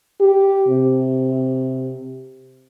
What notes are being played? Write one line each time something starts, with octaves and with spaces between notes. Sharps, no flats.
G4
C3